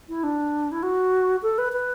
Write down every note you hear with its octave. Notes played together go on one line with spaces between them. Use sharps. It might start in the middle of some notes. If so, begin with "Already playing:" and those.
E4
D4
E4
F#4
A4
B4
B4